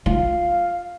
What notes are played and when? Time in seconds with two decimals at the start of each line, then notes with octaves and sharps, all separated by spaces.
0.06 F4 F5